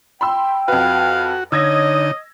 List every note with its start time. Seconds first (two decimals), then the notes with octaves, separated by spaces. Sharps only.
0.21 G5 B5 C6 E6
0.68 F2 F#4 B4 F5
1.52 D3 D#4 C#5 D#5 E6 G#6 A#6